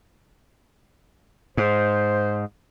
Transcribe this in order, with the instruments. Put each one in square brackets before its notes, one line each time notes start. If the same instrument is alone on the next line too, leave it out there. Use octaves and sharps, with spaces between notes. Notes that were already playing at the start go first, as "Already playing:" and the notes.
[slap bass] G#2 [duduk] C5